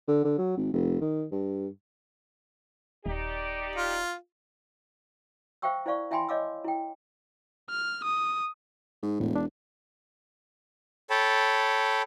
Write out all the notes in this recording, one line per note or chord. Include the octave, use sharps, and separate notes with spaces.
D3
D3
F#3
G#1
F1
D#3
G2
D#1 D#4 G4 D5
F4
C5 E5 F5 G5 C#6 E6
E4 C5 D5 F5 C#6
E4 E5 G5 G#5 B5 C6
C#5 D#5 F5 D6 E6
E4 G5
F6
D#6
G#2
E1 A2
D4
A4 C#5 G5 A5 B5